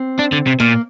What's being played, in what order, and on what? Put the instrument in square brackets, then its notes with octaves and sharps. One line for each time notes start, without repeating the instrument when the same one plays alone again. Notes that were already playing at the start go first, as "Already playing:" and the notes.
Already playing: [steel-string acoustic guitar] C4
[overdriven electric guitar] D4
D3
C3
[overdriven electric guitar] A#2 [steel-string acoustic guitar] A#3